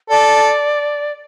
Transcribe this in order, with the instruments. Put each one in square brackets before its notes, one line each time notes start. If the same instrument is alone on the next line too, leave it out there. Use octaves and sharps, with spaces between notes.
[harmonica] A4 [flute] D5